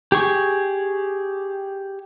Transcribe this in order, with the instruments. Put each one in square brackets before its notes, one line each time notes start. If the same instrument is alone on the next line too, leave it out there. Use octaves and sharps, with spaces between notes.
[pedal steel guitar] G4 G#4 C#6